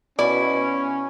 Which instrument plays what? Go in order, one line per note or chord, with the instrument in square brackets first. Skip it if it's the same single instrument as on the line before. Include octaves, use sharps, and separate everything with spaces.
[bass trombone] B2 [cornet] C#4 [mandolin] E4 [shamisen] D5